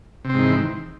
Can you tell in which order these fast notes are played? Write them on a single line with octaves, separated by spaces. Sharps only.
C3 C4 G#2 D#3 E3